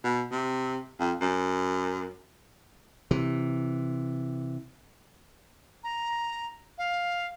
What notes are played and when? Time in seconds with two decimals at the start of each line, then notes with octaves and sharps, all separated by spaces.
0.04 B2
0.31 C3
1.00 F2
1.21 F#2
3.11 C3 E3
5.84 A#5
6.78 F5